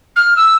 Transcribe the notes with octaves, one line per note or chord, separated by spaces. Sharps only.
F6
E6